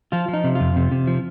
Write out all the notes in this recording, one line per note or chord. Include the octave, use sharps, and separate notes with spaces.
F3 F4
F3
D#4
C3
F2 F4
C3
C3
F3